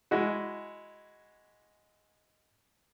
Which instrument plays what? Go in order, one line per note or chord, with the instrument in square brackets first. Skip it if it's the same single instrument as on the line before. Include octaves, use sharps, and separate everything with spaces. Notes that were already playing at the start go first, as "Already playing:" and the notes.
[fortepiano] G#3 E4 F#4